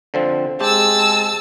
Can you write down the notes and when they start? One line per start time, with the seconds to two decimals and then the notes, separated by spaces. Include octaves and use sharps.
0.14 D3 F3 C4
0.60 G#3 C4 G4 A5 E6